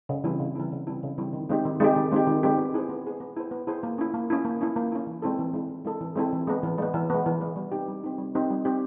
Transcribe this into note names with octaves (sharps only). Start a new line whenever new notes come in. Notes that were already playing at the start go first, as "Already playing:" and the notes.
C#3
E3 G3 C4 E4
C#3
E3 G3 C4 E4
C#3
E3 G3 C4 E4
C#3
E3 G3 C4 E4
D#3
G#3 C4 D#4 G4
D#3
G#3 C4 D#4 G4
D#3
G#3 C4 D#4 G4
D#3
G#3 C4 D#4 G4
B3
E4 G#4 C5
B3
E4 G#4 C5
B3
E4 G#4 C5
B3
E4 G#4 C5
A#3
C#4 E4
A#3
C#4 E4
A#3
C#4 E4
A#3
C#4 E4
E3
G#3 C4 E4 A4
E3
G#3 C4 E4 A4
E3
G#3 C4 E4 A4
E3
G#3 C4 E4 A4
E3
G#3 B3
E3
G#3 B3
E3
G#3 B3
E3
G#3 B3
G3
C4 D#4 G4
G3
C4 D#4 G4
G3
C4 D#4 G4
G3
C4 D#4 G4